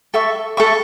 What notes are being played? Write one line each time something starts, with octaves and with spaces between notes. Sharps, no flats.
A4 E5 C#6
A4 E5 C#6